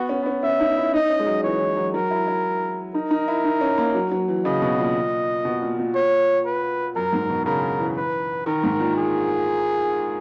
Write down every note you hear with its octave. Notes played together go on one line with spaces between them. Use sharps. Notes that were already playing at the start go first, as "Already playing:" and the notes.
Already playing: B3 F#4
C#4
B3
C#4
C#4 E5
D#4
E4
D#4 D#5
C#4
G#3
F#3
E3 C#5
E3
F#3
F#3 A#4
E4
E4
D#4 A#4
D#4
E4
D#4
C#4
A#3
F#3
F#3
E3
C#3 D#5
B2
A#2
B2
A#2
A#2
C#5
B4
F#2 A#4
G#2
B2
C#3 A#4
E3
B4
D#3 A#4
G#2
A#2
G#4